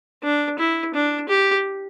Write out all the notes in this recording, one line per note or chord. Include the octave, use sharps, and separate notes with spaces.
D4
E4
D4
G4